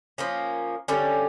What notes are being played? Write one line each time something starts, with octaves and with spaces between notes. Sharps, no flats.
F3 A#3 C#4
D3 G3 C#4